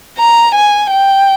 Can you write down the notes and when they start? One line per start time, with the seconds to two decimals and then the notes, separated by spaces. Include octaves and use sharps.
0.19 A#5
0.55 G#5
0.91 G5